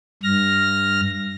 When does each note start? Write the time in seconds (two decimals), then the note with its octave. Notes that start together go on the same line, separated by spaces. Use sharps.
0.23 G2 F6 A#6